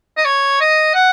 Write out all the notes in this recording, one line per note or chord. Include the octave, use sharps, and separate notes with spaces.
D#5
C#5
D#5
F#5